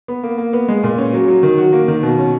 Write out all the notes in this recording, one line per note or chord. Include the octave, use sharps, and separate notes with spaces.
B3
A#3
A#3
B3
G#3
A#2
C#4
F#3
F#3
D#3
F#4
A#3
D#3
B2
C#4